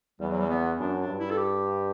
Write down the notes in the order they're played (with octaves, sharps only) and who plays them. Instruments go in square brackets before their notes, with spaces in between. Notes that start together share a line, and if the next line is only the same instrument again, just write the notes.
[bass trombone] E2 [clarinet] G3
[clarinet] F#3
G3
B3
[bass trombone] F#2 [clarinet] D4
[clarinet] D4
[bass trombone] G2
[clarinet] E4
A4
G4